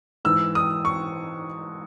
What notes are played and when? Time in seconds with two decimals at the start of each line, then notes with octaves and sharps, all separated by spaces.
0.25 G#2 E3 E6
0.55 D#6
0.85 C#6